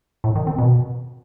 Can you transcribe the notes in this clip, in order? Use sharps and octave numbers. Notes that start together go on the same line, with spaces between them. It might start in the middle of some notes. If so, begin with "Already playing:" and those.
A2
D#3
C4
B2